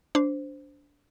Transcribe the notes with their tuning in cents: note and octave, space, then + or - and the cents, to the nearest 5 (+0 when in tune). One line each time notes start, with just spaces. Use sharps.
D4 -20 C5 -10